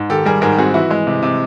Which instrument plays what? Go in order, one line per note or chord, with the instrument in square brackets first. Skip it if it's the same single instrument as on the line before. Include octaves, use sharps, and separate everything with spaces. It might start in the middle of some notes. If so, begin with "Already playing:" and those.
Already playing: [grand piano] G#2
[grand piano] D#3 [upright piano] G4 A4
[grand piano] G3 [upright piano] G#4 A#4
[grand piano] G#2 [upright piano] G#4 A#4
[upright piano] G4
[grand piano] C4 [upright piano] F#4 G#4
[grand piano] E3 [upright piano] E4 F#4
[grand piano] G#3
C3
C3